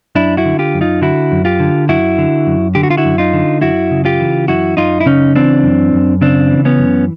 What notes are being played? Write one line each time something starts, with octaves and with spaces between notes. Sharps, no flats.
F#2 D4 E4
E4 F#4
D3
F4 G4
F#2
D#4 F4
D3 E4 F#4
F#2
F4 G4
D3
F#2 E4 F#4
D3
F#2
D3 G4
F#4
F4
E4 F#4
F#2
D#4 F4
D3
F#2 E4 F#4
C#3
F4 G4
E3
F#2 E4 F#4
F#2 D#4 F4
E4
C#3 C#4 D#4
E3 C4 D4
F#2
F#2
C#3 C4 D4
E3
B3 C#4
F#2